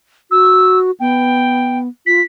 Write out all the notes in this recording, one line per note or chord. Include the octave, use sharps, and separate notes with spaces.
F#4 E6
B3 G5
F4 B6